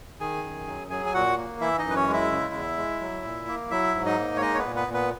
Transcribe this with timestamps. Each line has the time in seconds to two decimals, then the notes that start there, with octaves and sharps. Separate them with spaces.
0.20 D#3 G#4 G#5
0.44 F#2
0.67 F#3
0.90 F#3 G#4 G#5
1.06 G#5
1.14 A#2 F#4 F#5
1.37 A#3
1.61 E3 E4 E5
1.78 D#4 D#5
1.84 F#2
1.90 B4
1.96 C#4 C#5
2.07 G#3
2.13 E4 E5
2.31 C#3
2.54 E2
2.78 G#3
3.01 F#3
3.24 A#2
3.48 A#3
3.71 F#3 E4 E5
3.95 G#2
4.06 D#4 D#5
4.18 A#3
4.36 C#5
4.41 G#3 D#4 D#5
4.54 C#5
4.59 B3 B4
4.64 A#2
4.76 B3 B4
4.88 A#2
4.94 B3 B4